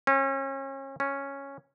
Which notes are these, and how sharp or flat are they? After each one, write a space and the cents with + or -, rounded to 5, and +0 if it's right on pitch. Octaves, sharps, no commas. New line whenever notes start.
C#4 -35
C#4 -5